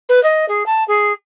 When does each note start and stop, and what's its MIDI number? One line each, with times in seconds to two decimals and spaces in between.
0.09 0.22 71
0.23 0.45 75
0.48 0.63 68
0.66 0.84 81
0.88 1.12 68